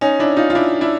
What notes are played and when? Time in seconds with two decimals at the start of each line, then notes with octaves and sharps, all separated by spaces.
0.01 C#4 D#4
0.19 D4 E4
0.37 D#4 F4
0.50 F4
0.55 D4 E4
0.81 D4 E4